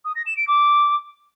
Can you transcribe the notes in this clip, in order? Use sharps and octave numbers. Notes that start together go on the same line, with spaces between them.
D#6
A#6
E7
D7
D6